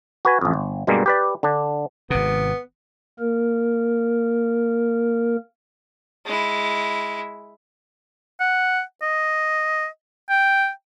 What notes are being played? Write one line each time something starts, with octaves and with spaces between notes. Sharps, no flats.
F#4 B4 G#5
A1 F2
G1
G2 B2 G3 G#3 A#3
G4 B4 D5
D3 D4
G#1 C3 B3
A#3 A#4
G#3 E4
F#5
D#5
G5